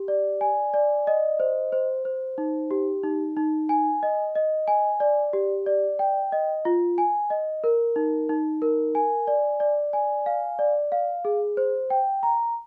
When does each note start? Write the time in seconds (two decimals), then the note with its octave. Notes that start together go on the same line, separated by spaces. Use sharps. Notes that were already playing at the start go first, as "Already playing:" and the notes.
Already playing: G4
0.08 D5
0.41 G#5
0.74 D5
1.07 D#5
1.40 C5
1.72 C5
2.05 C5
2.38 D#4
2.71 G4
3.04 D#4
3.37 D#4
3.69 G#5
4.03 D#5
4.35 D#5
4.68 G#5
5.00 D5
5.33 G4
5.66 D5
5.99 G5
6.32 D#5
6.65 F4
6.98 G#5
7.30 D#5
7.64 A#4
7.96 D#4
8.29 D#4
8.62 A#4
8.95 G#5
9.27 D5
9.60 D5
9.93 G#5
10.26 F5
10.59 D5
10.92 F5
11.25 G#4
11.57 C5
11.90 G5
12.23 A#5